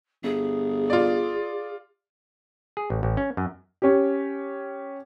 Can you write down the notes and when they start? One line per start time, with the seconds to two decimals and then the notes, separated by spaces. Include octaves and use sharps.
0.24 G1 G#4
0.90 F4 D5
2.77 G#4
2.90 A1
3.03 A1
3.17 C#4
3.37 F#2
3.82 C#4 G4